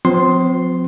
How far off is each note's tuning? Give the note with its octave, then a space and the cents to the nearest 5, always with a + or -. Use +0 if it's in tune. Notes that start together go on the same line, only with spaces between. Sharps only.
F3 +30 C4 -35 C6 +0